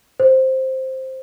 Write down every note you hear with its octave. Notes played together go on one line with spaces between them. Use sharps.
C5